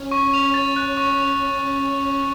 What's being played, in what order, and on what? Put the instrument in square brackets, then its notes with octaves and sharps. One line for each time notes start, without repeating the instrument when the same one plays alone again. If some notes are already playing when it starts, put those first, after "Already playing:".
Already playing: [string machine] C#4
[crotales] C#6
F7
A6
F#6
C#6
F7